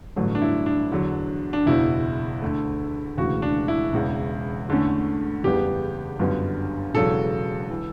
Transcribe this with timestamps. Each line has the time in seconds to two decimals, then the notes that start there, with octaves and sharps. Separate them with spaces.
0.16 A1 G2 D3 F#3 A3
0.35 D4
0.42 E4
0.66 D4
0.91 E2 D3 F#3
1.53 D4
1.66 F#1 E2 B2 E4
2.42 D2 D3 A3
3.17 E1 D2 C#3 E3 F#4
3.42 D4
3.68 E4
3.93 E1 E2 C#3
4.68 E2 D3 A3 C#4
5.44 F#1 E2 C#3 G3 B3 G4
6.19 G1 F#2 D3 G3 B3
6.94 E1 E2 C#3 F#3 A4
7.70 E3